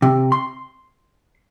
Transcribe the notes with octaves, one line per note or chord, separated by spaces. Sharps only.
C3
C6